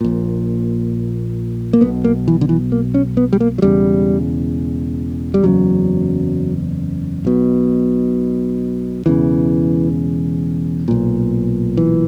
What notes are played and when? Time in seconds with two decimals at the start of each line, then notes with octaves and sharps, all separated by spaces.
0.01 A#1 A#2
1.73 A#3
1.81 B1 B2 B3
2.04 A#3
2.28 E3
2.41 D3
2.49 E3
2.72 A#3
2.94 C#4
3.17 B3
3.33 G3
3.40 A#3
3.58 F#3
3.62 E1 E2 C#3 G3
5.34 G3
5.44 F#1 E2 C#3 F#3
7.25 B1 B2
9.06 E1 E2 C#3 E3
10.88 B1 A#2
11.77 E3